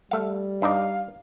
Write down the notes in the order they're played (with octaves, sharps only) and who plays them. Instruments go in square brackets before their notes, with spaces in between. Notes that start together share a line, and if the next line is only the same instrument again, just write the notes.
[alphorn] G3 [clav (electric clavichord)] A3 F5
[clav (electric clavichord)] G2 D#4 D5 [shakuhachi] F5